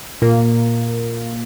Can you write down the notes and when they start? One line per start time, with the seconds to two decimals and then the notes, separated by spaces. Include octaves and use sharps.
0.22 A#2 A#3